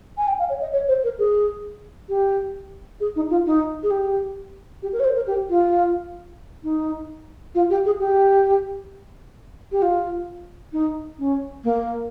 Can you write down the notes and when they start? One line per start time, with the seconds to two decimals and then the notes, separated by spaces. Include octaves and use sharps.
0.18 G#5
0.28 G5
0.39 F5
0.50 C#5
0.61 D#5
0.73 C#5
0.88 C5
1.04 A#4
1.19 G#4
2.09 G4
3.00 G#4
3.16 D#4
3.30 F4
3.46 D#4
3.83 G#4
3.91 G4
4.83 G4
4.93 A#4
5.00 C#5
5.04 C5
5.16 A#4
5.27 G4
5.50 F4
6.64 D#4
7.55 F4
7.70 G4
7.86 G#4
8.00 G4
9.72 G4
9.82 F4
10.73 D#4
11.19 C#4
11.64 A#3